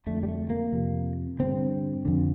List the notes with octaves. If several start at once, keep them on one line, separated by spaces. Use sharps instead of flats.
F2 D3 A3
G3
A3
A#3
F2 C3
G2 D3 C4
F2 D3